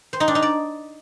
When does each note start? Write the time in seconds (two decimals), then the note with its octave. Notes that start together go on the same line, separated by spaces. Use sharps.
0.13 C5
0.20 D#4
0.28 D4
0.35 D#4
0.42 D5